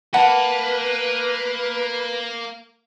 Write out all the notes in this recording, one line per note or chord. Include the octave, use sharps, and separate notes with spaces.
A#3 B4 F#5 A5 B5